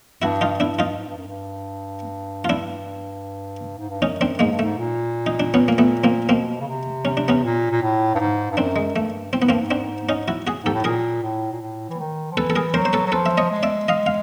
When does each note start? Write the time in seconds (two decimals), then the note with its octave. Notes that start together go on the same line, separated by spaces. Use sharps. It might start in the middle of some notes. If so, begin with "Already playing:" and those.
0.22 G2 E4 F#4
0.41 D#4 F4
0.60 G2 D4 E4
0.79 D#4 F4
0.98 G#2
1.08 G2
1.17 F#2
1.27 G2
2.45 F4
2.50 D4 E4
3.78 G#2
3.90 G2
4.02 F#2 C#4 D#4
4.21 C4 D4
4.39 G#2 G#3 A#3
4.51 G2
4.59 G#2 A3
4.78 A#2
5.26 D#4
5.40 D4
5.54 B3 C#4
5.68 A#3
5.78 A3 B3
6.04 A#3 C4
6.29 B2 A#3 C4
6.60 C#3
6.67 C3
7.05 C3 C#4
7.17 D4
7.28 B3 C#4
7.43 A#2
7.71 A#2
7.81 A2
8.15 G2
8.19 G#2
8.51 G2
8.57 F#2 C4 D4
8.76 G#3
8.96 G2 A3
9.33 A2 C4
9.42 G#2 B3
9.49 G2 A#3 C4
9.60 G#2
9.71 C4 D4
10.09 C#4 D#4
10.28 E4 F#4
10.47 F#4 G#4
10.64 G#2 G4 A4
10.74 A2
10.84 A#2 G#4 A#4
11.23 A2
11.52 A#2
11.61 A2
11.89 E3
11.99 D#3
12.31 F3
12.37 E3 A4 B4
12.50 A4
12.56 G#4 A#4
12.74 F#3 A#4 C5
12.85 C5
12.93 A4 B4
13.06 F#3
13.12 F3 A4 B4
13.26 E5
13.38 C#5 D#5
13.50 G#3
13.63 D5 E5
13.88 D#5 F5
14.06 F5